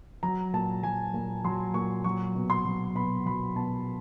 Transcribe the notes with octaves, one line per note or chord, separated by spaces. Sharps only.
F#3 A#5
A#2 A5
F#3 G#5
A#2
F#3 C6
A#2 C#6
F#3 C#6
B2
C6
F#3
B2 B5
F#3 B5
B2 A5